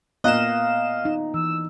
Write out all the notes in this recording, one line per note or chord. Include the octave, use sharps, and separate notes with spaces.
A#2 B3 D#5 F5 F#6 E7
D#4
E3 E6